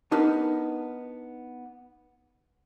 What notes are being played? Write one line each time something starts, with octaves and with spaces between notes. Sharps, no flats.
B3 D4 D#4 A#4 B4